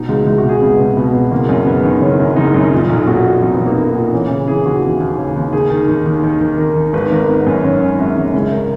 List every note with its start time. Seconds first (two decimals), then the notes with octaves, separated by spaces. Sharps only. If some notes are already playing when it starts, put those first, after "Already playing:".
Already playing: B2 D#4
0.09 C#2
0.26 C#2 E4
0.38 F#4
0.44 B2
0.49 G#4
0.61 C#2 B3
0.79 B2
0.97 B2 B3
1.14 B2
1.31 F#1 A#3
1.49 F#2
1.66 F#1 B3
1.84 D#3
2.01 F#1 C#4
2.20 F#2
2.36 F#1 D#4
2.54 F#2
2.72 A#2
2.89 B1
3.07 A#2 F#4
3.25 A#2
3.42 B1 D#4
3.54 B3
3.60 B1
3.66 A#3
3.77 B1
3.95 A#2
4.12 E3 C#4
4.30 C#3
4.47 E3 G#4
4.65 D#2 F#4
4.82 E3
5.00 D#2
5.18 C#3
5.36 D#2
5.53 D#3 G#4
5.70 D#3
5.88 D#3
6.06 D#2
6.23 D#3
6.41 D#3
6.58 D#3 A#4
6.76 D#3
6.93 G#1 B4
7.11 G#1 A#4
7.29 G#1 B3
7.47 F#2
7.64 D#3 C#4
7.82 G#1
7.98 G#1 E4
8.16 G#1
8.33 C#2 E4
8.52 A#4